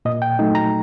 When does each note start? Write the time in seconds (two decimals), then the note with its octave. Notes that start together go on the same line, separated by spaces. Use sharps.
0.05 A#2 D#5
0.22 G5
0.39 F#3 A3 D#4
0.55 A#5